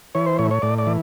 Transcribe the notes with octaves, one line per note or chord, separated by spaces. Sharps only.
E3 C#5
C5
A2 C#5
C#5
A2 D5
D5
E3